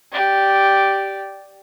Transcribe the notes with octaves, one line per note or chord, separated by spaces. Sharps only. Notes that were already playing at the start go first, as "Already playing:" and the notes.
G4 D5